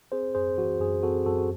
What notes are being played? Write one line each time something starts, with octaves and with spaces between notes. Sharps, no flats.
C4 G#4 C5
F#2 G#4 C5
E3 F#4
F#2 G#4
C4 F#4 A4
F#2 F#4 A4
F#4